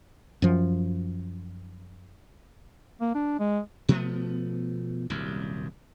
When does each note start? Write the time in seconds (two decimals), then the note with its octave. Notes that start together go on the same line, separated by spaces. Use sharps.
0.42 F#2 F3
3.01 A#3
3.15 D4
3.40 G#3
3.89 B2 F3 A3 B3
5.10 D#1 C2 F#2